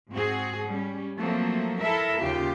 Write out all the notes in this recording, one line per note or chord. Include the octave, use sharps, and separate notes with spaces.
G#2 C4 F#4 G#4
G3 C#4
F3 F#3 A3 A#3 C4
E4 A4 A#4 E5
D#2 C#3 F4 G4